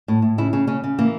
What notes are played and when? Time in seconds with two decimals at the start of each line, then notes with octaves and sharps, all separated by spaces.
0.08 A2
0.22 A2
0.38 C#3 E4
0.53 C#3
0.67 C#3 C#4
0.84 C#3
0.99 E3 A#3